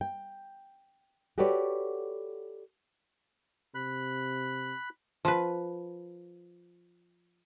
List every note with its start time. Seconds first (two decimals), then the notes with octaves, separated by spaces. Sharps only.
0.01 G5
1.38 F#4 G4 A4 B4 C#5 D5
3.75 C3 B5 F#6
5.25 F3 B4